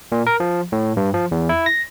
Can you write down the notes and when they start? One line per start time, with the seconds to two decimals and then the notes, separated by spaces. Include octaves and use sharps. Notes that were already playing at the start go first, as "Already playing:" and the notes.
0.12 A#2
0.27 A#4
0.40 F3
0.72 A2
0.97 G2
1.14 F3
1.31 E2
1.49 E4
1.66 A#6